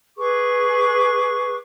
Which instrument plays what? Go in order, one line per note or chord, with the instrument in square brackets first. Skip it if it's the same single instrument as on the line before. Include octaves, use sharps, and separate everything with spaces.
[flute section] G#4 B4 C#6 D6